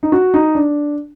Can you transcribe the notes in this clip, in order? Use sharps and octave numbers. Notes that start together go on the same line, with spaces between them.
D#4
F#4
D#4
D4